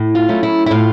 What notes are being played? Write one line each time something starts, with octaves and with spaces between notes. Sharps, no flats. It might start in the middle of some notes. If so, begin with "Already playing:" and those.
Already playing: A2
F4
F#3 A3 C#4 E4
E4
E4
A2 F4